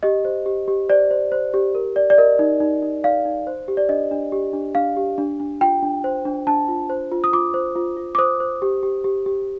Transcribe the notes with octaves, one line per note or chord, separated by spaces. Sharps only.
G4 D#5
C5
G4
G4
C5 D5
C5
C5
G4
A#4
D5
D5
A#4 D#5
D#4
D#4
D#4
D5 F5
D#4
C5
G4
D5
D4 D#5
D4
G4
D4
D4 F5
G4
D4
D4
F4 G5
D4
C5
D4
D4 A5
F4
C5
F4
D#6
F4 D6
C5
F4
F4
D6
C5 D#6
C5
G4
G4
G4
G4